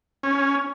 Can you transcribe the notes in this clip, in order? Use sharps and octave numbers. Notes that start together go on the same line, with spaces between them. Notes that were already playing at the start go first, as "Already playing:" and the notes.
C#4